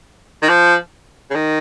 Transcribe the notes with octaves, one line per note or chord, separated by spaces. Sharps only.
D#3
F3
C#3
D#3